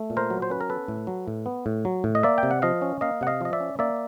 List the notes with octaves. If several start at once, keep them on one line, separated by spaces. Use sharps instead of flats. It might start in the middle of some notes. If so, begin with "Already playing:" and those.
Already playing: A3
A#2
A#4 C5
F#3
C5
C#4 B4
A#4
B3 A4 B4
A2
F#3
A2
B3
A2
F#3
A2
D#5
A#3 D5 E5
G5
C3
F#5
F3 D#5 F5
C#4
A#3 D#5 F5
C3 F#5
D#5 F5
F3 D#5
D5 E5
C#4
A#3 D5 E5